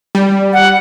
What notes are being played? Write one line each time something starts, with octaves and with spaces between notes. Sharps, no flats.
G3
F#5